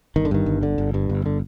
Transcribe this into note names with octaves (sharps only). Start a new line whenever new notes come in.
G1 D#3
D3
G2 D#3
G1
D3
G1
G2
G1
D3